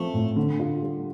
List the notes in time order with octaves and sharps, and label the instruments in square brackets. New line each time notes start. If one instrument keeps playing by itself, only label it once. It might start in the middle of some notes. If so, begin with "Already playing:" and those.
Already playing: [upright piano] F3 C4 [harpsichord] A3
[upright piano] A2
D3
F4
G3